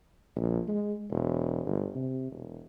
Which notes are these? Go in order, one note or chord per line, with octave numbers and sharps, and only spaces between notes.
A#1
G#3
E1
G1
C3
E1